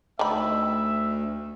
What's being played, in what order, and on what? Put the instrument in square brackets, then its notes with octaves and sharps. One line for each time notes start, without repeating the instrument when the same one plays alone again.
[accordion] D2 [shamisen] D#3 B5 [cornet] E5